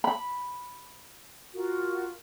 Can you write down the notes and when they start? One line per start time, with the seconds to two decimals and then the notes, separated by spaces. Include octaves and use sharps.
0.04 B5
1.53 F4 F#4 A#4